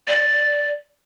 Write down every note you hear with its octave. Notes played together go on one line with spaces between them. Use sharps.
D5